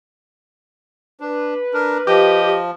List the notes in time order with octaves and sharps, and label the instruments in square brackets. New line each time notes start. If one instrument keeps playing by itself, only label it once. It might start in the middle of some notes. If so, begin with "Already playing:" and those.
[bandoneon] D4 [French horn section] B4
[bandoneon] D4 A#4
[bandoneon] F3 [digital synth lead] G4 [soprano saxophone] D#5